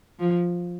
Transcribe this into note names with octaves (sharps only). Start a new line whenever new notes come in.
F3